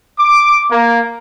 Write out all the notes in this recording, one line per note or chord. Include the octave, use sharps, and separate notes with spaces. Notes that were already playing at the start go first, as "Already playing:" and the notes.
D6
A#3